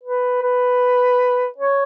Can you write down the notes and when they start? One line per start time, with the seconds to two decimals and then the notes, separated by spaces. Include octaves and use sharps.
0.03 B4
0.42 B4
1.58 C#5